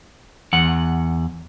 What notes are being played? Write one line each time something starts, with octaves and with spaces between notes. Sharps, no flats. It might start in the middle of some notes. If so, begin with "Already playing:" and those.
E2 F#5